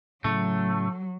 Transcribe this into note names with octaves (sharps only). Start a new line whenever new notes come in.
A2 C#3 F#3 A3